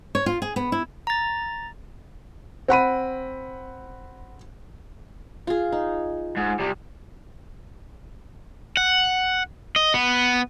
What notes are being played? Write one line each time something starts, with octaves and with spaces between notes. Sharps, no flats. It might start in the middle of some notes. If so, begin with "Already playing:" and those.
C#5
F4
G#4
B3
E4
A#5 A6
C4 F#5 B5 D#7
F4 G#4
D#4
G#2
C3 G3
F#5
D#5
B3